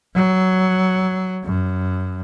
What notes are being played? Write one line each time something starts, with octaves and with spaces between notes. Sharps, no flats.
F#3
F#2